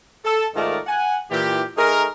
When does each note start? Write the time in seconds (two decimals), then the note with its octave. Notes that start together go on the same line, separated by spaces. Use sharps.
0.24 A4
0.55 G#2 D#3 A3 F4 A#4 D5
0.87 F#5 G#5
1.31 A#2 E3 G4
1.77 A3 D#4 G#4 A#4